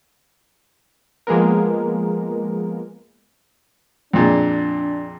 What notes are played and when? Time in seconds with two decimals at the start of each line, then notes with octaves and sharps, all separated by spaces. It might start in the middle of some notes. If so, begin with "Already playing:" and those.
1.27 F3 G#3 A#3 B3 A#4
4.13 F2 A#2 G#3 D4